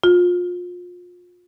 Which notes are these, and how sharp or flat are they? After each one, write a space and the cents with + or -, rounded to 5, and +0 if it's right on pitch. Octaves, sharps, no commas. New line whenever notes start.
F4 +30